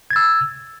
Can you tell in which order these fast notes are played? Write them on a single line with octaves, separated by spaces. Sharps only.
G#6 A6 E6